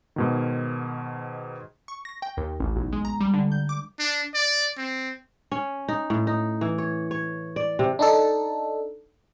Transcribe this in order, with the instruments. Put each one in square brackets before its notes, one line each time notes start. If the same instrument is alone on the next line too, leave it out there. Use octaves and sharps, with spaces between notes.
[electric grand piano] G#2 B2 D#3
[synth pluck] C#6
A#6
G5
D#2
A1
B1
G#3
A#5
G3
D3
G6
D6
[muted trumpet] D4
D5
C4
[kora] C#4
D#4
A2
D#4
E3
C#5
C#5
D5
C3
[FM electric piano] D4 D#4 A4